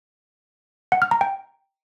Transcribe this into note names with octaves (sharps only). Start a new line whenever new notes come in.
F#5
F6
A#5
G5